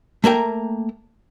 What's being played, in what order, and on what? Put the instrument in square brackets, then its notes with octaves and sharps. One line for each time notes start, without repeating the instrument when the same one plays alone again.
[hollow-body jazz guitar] A3 A#3 A#4 G5